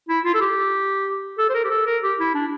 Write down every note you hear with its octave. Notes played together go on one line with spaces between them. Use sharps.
E4
F4
A4
G4
A4
C5
A#4
G4
A4
A#4
G4
E4
D4